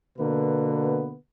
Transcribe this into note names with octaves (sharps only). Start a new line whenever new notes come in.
B2 D3 A#3 B3 B4